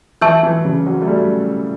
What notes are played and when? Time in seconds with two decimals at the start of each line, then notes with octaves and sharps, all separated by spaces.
0.21 E3 E5 A5 C#6 E6 G6
0.43 E3
0.65 C#3
0.86 F#3
1.02 A3
1.07 G3